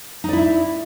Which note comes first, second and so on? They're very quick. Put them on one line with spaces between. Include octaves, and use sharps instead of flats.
D#4 D5 E4 E5